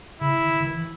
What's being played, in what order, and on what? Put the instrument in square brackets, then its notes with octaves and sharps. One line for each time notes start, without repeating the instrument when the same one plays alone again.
[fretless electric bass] C#3 [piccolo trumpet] E4
[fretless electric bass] D#3
D#3
E3